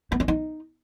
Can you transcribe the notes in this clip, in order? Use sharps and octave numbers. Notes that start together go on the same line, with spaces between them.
B3
C#4
D#4